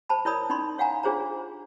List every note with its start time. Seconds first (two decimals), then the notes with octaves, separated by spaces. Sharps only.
0.09 C5 A5 B5
0.25 E4 A#4 C#5 D5 B5 D#6
0.50 C#4 D#4 D5 B5 C6
0.78 C#5 F5 F#5 G#5 A#5
1.03 D4 F4 G#4 C5 C#5 A#5